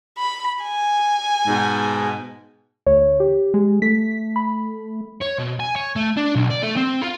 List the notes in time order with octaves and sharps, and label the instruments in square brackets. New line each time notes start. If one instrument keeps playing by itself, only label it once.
[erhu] B5
G#5
[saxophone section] G#2 B2
[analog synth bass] D2 [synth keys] C#5
[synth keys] G4
[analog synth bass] G#3
[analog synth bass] A3 [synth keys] B6
[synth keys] B5
[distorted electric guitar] C#5
B2
G#5
C#5
A3
D4
B1
D5
A3
C4
F4